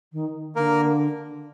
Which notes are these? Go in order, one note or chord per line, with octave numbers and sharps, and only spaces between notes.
D#3
D3 A#3 A#4